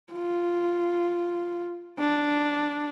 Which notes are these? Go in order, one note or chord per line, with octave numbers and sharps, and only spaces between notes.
F4
D4